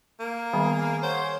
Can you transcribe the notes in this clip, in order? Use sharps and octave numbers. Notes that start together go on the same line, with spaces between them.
A#3
D#3 G3 B3 G#4
C5 C#5 F#5